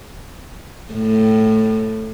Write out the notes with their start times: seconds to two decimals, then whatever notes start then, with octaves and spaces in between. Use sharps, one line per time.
0.93 A2